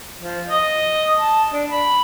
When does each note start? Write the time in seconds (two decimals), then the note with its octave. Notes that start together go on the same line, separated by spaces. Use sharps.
0.20 F3
0.48 D#5
1.17 A5
1.52 D4
1.70 B5